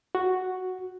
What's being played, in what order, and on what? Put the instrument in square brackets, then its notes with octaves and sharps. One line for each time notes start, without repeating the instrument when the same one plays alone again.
[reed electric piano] F#4